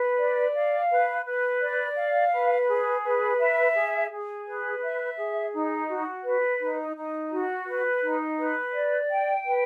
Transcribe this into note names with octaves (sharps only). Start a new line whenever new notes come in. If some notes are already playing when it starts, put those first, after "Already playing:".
Already playing: B4
D5
F5
B4
B4
D5
F5
B4
G#4
B4
E5
G#4
G#4
B4
E5
G#4
D#4
F#4
B4
D#4
D#4
F#4
B4
D#4
B4
D5
G5
B4